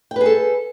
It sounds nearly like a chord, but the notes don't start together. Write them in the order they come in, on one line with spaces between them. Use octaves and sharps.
G5 B4 G#4 A4